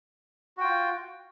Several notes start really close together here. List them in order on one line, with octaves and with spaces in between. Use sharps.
F#4 G5 F4